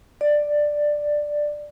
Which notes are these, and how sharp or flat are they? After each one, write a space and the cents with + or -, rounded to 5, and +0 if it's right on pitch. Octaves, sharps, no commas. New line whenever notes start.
D5 +10